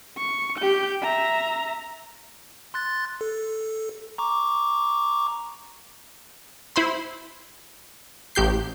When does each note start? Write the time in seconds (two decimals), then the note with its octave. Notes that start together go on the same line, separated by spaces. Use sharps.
0.18 C#6
0.58 G4 G6
1.02 E5 A#5
2.74 C6 F#6 A6
3.21 A4
4.18 A#5 C#6 D6
6.76 E4 C5 B5 C6
8.35 A1 G4 G6 C7